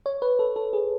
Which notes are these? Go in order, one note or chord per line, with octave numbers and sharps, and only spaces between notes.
C#5
B4
A4
A4
G#4